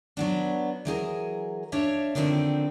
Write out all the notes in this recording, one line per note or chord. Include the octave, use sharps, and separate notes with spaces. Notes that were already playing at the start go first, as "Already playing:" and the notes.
F#3 B3 D4
E3 F#3 G#4 A#4
D4 C#5 E5 F5
D3 D#3 F3 C4 D4